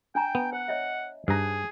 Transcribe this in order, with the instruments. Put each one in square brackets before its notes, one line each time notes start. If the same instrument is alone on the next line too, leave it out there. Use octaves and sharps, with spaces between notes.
[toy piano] D4 G#5 A#5 [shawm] G5
[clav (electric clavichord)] B3
[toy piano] C5 [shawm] F#5
[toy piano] C#5 D#5 E5
[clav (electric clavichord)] G2 A#5 [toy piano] D#4 C5 [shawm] G#4